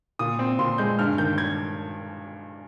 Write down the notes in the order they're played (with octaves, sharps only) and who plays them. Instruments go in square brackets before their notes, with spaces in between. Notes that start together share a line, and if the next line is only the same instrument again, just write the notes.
[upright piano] A#2 D#6
C4
A#2 C6
G#3 G6
G2 F6
D#3 G6
G#6